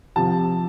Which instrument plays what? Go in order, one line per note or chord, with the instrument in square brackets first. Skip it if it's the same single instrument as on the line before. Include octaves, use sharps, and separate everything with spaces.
[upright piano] C3 F3 A5